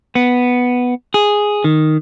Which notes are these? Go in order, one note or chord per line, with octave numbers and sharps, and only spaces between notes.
B3
G#4
D#3